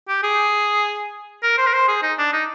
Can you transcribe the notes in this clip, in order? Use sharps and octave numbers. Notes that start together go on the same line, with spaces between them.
G4
G#4
A#4
C5
A#4
C5
G#4
D#4
D4
D#4